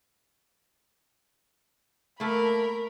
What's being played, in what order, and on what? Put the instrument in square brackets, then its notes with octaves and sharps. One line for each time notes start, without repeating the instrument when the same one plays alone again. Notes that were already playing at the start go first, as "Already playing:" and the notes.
[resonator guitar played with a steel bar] A3 A#3 [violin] A#4 B5